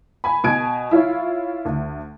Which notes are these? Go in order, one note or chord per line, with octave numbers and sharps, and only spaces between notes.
G#5 B5
B2 G#5 G#6 D7
E4 F4 C#5
D2